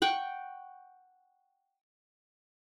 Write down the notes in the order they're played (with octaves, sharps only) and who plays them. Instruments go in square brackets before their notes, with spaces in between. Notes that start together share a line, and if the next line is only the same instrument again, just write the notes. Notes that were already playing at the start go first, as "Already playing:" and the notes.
[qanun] F#5 G5 C#6